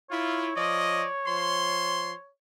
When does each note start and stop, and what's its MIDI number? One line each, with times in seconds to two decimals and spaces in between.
0.10 0.49 64
0.10 0.49 65
0.10 2.29 73
0.55 1.05 53
0.55 1.05 74
0.55 1.05 75
1.26 2.13 53
1.26 2.13 72
1.26 2.13 84